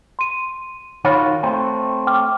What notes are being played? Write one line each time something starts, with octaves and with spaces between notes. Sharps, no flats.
C6 D#7
D#3 F4 F#4 C#5 B5
A3 C4
G5 D6 F6